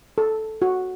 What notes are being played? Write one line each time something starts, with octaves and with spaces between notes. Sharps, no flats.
A4
F#4